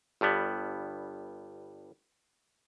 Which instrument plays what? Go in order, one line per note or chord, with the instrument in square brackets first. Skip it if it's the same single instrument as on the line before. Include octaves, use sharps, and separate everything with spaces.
[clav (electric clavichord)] G1 G2 G3 B3